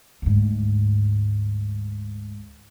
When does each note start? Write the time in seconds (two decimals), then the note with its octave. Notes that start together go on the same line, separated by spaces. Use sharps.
0.22 D2 G#2